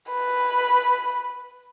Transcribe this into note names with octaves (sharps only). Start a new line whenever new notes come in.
B4